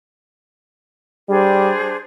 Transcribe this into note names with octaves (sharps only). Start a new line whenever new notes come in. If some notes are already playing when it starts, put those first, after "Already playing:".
G3 D4 G#4 C5